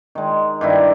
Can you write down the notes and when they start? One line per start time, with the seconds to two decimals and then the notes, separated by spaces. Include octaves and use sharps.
0.15 D#3 G#3
0.61 G2 D#3 E4